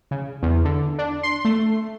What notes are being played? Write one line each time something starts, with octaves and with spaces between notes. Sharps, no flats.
C#3
E2
D3
D4
C6
A3